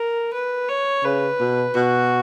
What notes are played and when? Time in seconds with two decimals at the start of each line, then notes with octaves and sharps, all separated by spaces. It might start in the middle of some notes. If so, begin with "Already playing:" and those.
Already playing: A#4
0.33 B4
0.69 C#5
1.04 C#3 B4
1.40 B2
1.75 B2 F#4